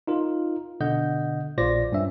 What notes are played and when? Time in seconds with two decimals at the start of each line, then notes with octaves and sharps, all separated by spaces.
0.07 D#4 F4 A#4
0.80 B2 D3 D#5 F#5 G6
1.58 A#1 A#2 F4 C5 D5 A#6
1.92 G2 C#4 E5